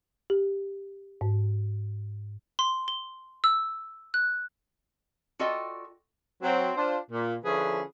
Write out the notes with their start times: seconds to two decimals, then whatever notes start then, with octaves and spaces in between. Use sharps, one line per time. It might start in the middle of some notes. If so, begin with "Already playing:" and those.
0.30 G4
1.21 G#2
2.59 C6
2.88 G7
3.44 E6
4.14 F#6
5.39 F4 F#4 A4 D5 D#5 G5
6.43 F#3 C4
6.76 D4 F4 C5
7.11 A#2
7.44 D3 F3 C#4 E4 G#4 B4